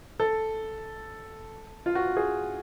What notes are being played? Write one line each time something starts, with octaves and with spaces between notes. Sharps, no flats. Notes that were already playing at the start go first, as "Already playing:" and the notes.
A4
F4
F#4
G#4